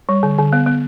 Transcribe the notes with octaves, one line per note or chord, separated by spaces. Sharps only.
G3
D3
D3
B3
B3